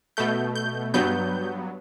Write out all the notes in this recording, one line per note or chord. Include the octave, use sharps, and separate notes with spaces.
B2 A3 G6
G6
G2 F#3 B3 G6